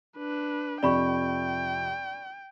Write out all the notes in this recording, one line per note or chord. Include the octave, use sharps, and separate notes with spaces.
D4 B4
F2 C3 D5 G5 B5 C#6